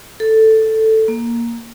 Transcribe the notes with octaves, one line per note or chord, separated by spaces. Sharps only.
A4
A#3